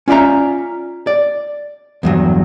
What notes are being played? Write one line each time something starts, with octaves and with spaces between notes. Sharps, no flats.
C#4 F4 D5 E5 A#5
D5
E2 G2 F#3